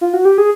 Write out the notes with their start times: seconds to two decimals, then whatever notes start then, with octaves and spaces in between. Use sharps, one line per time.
0.01 F4
0.14 F#4
0.25 G4
0.38 G#4